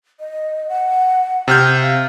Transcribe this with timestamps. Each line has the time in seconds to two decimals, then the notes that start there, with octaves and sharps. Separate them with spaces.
0.20 D#5
0.69 F#5
1.48 C3 G5 F6 G6
1.82 F5